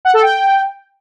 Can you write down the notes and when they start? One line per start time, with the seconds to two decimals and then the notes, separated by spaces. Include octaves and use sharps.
0.05 F#5
0.14 A4
0.22 G5